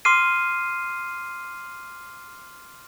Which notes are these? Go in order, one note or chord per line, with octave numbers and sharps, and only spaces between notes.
C6 D6 F6 C7 D#7